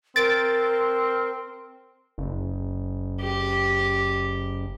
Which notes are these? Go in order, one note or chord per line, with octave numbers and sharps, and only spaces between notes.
C4 A#4 A6 D7
F#1
G4